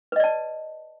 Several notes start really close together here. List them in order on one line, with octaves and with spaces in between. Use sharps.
B4 D#5 D5 A5